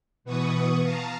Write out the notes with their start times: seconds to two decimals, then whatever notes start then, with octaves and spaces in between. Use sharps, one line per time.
0.24 B2 E3 B3 B4 C#6 D#6
0.83 F5 A5 A#5